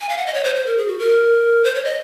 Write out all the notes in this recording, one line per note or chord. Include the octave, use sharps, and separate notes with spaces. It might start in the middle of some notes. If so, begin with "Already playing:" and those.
G#5
F5
F#5
D#5
C#5
C5
C5
A#4
G#4
F#4
A#4
C5
C#5
D#5